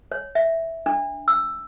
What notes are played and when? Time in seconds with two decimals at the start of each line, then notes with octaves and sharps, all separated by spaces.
0.12 C#5
0.35 E5
0.86 D4
1.28 E6